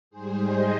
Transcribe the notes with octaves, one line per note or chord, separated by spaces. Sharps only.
G#2 G3 G#4 C5
C5 D#5